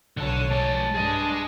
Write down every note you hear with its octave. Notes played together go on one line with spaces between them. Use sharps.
B1 D3 C#5 A5
G#3 D5 A5
G2 D4 G#4 D#5